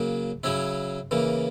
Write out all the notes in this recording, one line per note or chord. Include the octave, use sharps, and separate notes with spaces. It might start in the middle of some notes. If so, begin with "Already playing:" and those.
Already playing: C#3 F#3 A#3
C#3 F#3 C#4 E4
C#3 E3 A#3